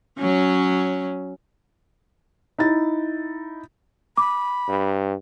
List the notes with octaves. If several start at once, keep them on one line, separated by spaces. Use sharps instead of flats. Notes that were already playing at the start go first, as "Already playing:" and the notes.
F#3 C#4
D#4 E4 A6
B5 D6
G2